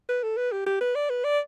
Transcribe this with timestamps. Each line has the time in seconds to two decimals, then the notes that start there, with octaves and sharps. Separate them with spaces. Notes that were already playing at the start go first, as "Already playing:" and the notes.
0.09 B4
0.23 A4
0.37 B4
0.52 G4
0.66 G4
0.81 B4
0.95 D5
1.10 B4
1.24 D5